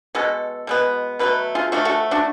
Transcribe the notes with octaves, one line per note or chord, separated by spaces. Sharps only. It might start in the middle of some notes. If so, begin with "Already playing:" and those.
B2 G#3 B3 F#4 A4
B2 G#3 B3
B2 F#3 A3 B4
F4 G#4
F3 A3 D4 F#4
F#4 A4
D4 F#4